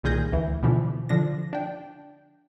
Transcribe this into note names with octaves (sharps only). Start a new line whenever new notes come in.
C2 A#2 D#3 G#4 G6 A#6
D2 E3
B2 D3 E3 F3
D3 F3 D4 A#6
D4 G5